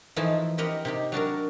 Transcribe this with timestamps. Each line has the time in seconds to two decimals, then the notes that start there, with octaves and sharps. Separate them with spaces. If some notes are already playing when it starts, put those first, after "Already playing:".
0.16 E3 F3 A3 D#4 E4
0.58 C4 G4 A#4 D#5 F#5 B5
0.85 C3 D#4 G4
1.12 F#3 D4 F#4 A#4